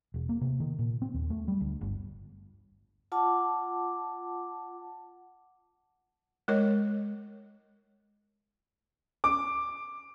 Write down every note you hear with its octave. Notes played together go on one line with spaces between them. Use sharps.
E1
A#3
C3
D#3
A#2
C4
D#2
A3
G3
D2
G1
F4 F#5 A5 D6
G#3 A#4 C#5 D#5
D6